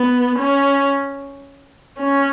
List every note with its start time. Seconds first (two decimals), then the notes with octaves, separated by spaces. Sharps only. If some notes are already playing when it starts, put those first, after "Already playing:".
Already playing: B3
0.38 C#4
2.00 C#4